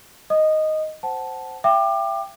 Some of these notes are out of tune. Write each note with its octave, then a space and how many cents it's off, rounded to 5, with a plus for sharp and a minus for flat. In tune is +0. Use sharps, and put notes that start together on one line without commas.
D#5 +0 D#6 -20
C5 +0 F#5 +15 A5 -10
E5 +35 G5 +0 D6 +30